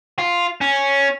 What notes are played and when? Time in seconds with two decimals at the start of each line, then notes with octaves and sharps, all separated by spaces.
0.19 F4
0.61 C#4